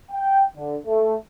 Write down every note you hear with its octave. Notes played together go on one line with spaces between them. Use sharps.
G5
D3
A3